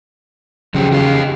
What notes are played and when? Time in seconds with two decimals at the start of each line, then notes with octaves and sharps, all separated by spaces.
0.74 C#3 F3 F#3 G4
0.93 G4 D#5 F5